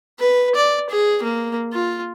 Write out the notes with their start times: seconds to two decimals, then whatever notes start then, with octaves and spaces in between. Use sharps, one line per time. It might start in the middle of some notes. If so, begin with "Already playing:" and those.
0.19 B4
0.55 D5
0.90 G#4
1.23 A#3
1.73 F4